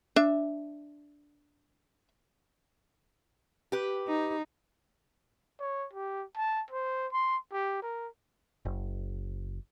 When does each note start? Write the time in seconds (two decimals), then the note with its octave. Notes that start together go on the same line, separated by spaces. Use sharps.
0.16 D4 E5
3.72 G4 B4
4.08 D#4
5.60 C#5
5.93 G4
6.36 A5
6.70 C5
7.12 C6
7.52 G4
7.82 A#4
8.65 F#1